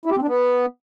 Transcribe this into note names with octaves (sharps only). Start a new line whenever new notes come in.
E4
G4
C4
D4
B3